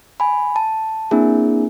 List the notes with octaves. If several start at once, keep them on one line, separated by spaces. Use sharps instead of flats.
G#5 B5
A5
A#3 C4 D4 E4 G#4